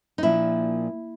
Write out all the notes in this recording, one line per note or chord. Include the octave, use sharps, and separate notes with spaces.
D#4
A#2 F3 A#3 D4 E4